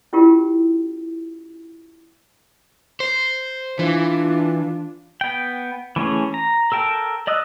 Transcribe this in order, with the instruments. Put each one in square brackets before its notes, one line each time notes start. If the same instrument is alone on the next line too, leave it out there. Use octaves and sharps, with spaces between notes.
[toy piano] C#4 E4 F4 G4 A#4
[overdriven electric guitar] C5
[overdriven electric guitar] E3 [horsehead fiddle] D4 F4
[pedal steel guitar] B3 G5
E3 A3 C#4 G#4
A#5
A4 A#4 G5 A5
D5 D#5 D#6 E6 F#6